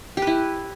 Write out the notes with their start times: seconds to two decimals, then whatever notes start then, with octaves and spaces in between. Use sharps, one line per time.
0.17 G4
0.22 B4
0.27 E4